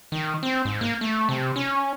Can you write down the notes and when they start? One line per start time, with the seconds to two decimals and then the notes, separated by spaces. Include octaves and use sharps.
0.12 D#3
0.43 C4
0.65 G#2
0.81 A#3
1.01 A3
1.29 C3
1.56 C#4